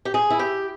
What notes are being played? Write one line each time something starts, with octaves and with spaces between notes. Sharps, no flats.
G4
G#4
E4
G4